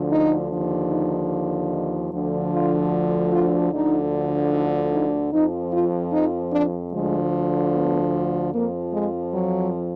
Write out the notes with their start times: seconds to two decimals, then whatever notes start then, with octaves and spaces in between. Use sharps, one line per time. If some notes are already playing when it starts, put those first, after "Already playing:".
Already playing: D2 D3 F3
0.11 D#4
0.50 D#2 D3 F3
0.91 D#4
1.71 D#4
2.11 D2 D3 F3
2.51 F4
3.31 F4
3.71 D2 D3 F3 D#4
4.52 D#4
4.92 D#4
5.32 F2 F3 D#4
5.72 F4
6.12 D#4
6.52 D4
6.92 D2 D3 F3 G#3
7.73 B3
8.53 F2 F3 A#3
8.93 G#3
9.33 F#3